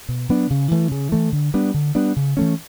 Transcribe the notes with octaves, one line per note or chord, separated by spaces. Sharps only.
B2
F#3 B3 D4
C#3
E3 A3
C#3
E3 A3
D3
G3 B3 D4
D3
G3 B3 D4
C#3
E3 A3 C#4